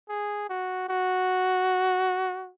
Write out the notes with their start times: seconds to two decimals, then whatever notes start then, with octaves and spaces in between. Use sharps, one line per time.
0.09 G#4
0.49 F#4
0.89 F#4